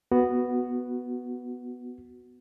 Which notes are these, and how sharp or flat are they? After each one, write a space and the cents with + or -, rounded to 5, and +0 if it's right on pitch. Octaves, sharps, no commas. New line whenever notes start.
B3 +0 F#4 +0